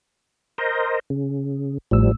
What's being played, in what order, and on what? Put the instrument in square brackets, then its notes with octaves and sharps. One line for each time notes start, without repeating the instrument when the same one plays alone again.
[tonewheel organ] A#4 C5 D#5
C#3
[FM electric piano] A1 A2 E6 [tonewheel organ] F3 G3